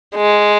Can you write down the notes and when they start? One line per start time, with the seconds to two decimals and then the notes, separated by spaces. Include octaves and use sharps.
0.16 G#3